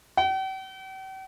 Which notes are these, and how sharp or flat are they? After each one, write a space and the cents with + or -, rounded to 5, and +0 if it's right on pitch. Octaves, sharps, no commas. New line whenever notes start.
G5 -45